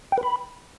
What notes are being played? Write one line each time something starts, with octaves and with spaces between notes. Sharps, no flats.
G5
B4
B5